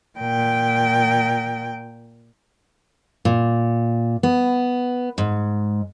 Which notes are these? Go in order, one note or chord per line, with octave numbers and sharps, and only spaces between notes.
A#2 G5
A#2
B3
G#2